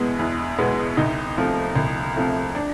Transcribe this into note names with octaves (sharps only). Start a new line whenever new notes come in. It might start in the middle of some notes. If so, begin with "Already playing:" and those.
Already playing: E2 B2 G#3 B3
E2
B2 G#3 B3
C2 D#4
C3 F3 A3
C2
C3 F3 A3
D4